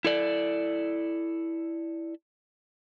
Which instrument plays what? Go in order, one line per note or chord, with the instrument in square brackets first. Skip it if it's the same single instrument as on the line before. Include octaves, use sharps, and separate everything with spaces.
[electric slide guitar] E4 A4 D5